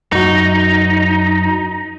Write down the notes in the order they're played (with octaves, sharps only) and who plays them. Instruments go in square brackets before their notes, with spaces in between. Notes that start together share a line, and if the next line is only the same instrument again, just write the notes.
[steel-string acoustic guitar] F#2 F#4 [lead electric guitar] D#4